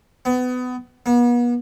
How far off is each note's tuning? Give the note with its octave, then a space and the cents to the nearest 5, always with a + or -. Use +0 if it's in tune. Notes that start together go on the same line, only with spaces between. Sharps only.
B3 +25
B3 -40